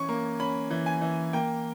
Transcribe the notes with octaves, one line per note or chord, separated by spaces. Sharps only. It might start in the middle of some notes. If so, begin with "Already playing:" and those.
Already playing: E3 C#4 C#6
A#3
C#4 B5
E3
G#5
E3
A#3 G5